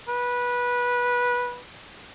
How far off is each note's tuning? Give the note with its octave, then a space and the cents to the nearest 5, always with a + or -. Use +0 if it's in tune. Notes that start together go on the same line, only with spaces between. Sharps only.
B4 -15